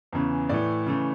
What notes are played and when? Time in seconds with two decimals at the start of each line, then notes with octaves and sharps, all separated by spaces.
0.12 E2 C#3 E3
0.49 A2 E3 A3 D5
0.87 C#3 E3 A3